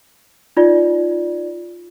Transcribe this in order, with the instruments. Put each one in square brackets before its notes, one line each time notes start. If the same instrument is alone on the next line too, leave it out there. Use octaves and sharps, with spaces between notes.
[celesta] D#4 F4 D5